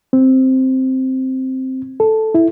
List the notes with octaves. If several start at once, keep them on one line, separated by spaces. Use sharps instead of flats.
C4
A4
E4